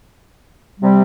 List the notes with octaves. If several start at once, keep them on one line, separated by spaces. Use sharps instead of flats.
C3 G3